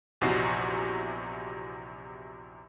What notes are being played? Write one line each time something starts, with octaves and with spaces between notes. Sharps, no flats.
A#1 E2 C3 D#4 F#4 C7